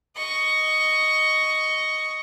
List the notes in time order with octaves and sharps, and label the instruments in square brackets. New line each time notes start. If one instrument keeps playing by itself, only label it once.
[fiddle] D#5 C#6